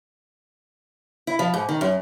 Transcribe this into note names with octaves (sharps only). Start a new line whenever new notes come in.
E4
F3
G#2
D#3
F#2